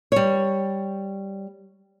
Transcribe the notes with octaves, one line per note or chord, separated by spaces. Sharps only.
G3 C#5